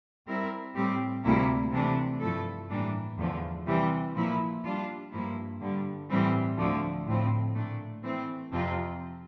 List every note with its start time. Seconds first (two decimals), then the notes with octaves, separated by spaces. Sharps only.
0.27 G3 C4 E4 A#4 E5
0.75 A2 G3 C4 G4
1.23 D2 C3 G3 A#3 E4
1.71 C3 E3 A3 D4
2.21 G2 F3 A3 E4 A4
2.69 A2 E3 G3 A#3 D4
3.18 E2 D3 F3 A3
3.66 C3 E3 G3 C4
4.14 A#2 F3 A#3 E4
4.63 G3 D4 F4
5.12 G2 F3 A#3 E4
5.60 G2 D3 G3
6.09 A2 E3 G3 C4
6.58 D2 D3 F3 A3
7.06 A2 F3 C4
7.54 A#2 A3 D4
8.03 E3 A3 C4
8.52 F2 C3 F3 C4 F4